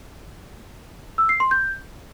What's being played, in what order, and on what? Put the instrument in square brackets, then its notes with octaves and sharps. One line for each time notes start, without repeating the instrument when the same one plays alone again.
[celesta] E6
C7
C6
G6